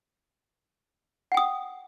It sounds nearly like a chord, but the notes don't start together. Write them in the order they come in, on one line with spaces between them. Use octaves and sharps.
F#5 G5 D#6